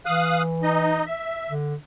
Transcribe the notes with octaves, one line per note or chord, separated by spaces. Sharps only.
E3 F5 D#6 F#6
D#4 D#5
E5
D3